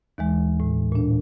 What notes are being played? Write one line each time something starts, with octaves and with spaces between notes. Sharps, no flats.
D#2 E3 G#3
A2
A#2 D4